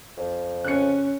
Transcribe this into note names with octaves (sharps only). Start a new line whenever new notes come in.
F2
C#3 C#4 F#6 C#7